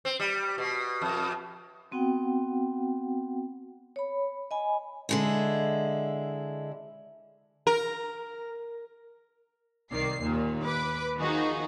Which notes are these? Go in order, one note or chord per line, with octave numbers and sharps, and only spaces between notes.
C4
G3
B2
F2
B3 C4 F#4 F#5 G5
C#5 B5
D#5 G#5 B5
D3 G#3 E4
A#4
C2 D#3 D5 C7
D#2 A#2 D#3
B4 D6
D#3 F3 D#4 F#4 G#4